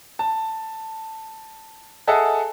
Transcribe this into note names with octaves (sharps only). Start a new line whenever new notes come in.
A5
G#4 A4 D#5 E5 F#5 A5